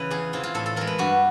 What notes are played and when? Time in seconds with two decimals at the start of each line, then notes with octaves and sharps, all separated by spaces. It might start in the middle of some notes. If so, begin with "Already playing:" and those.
Already playing: C#3 E3 B4
0.11 E2 G#4
0.33 C3 E3 F4
0.43 F4
0.54 A2 A4
0.66 A4
0.76 E3 G#3 A#4
0.87 B4
0.98 G2 F#4